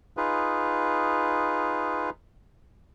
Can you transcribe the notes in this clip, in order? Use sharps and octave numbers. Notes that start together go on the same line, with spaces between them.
D#4 F4 G#4 B4